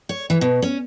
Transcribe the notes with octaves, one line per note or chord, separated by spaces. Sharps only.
C#5
E3
B2
C#4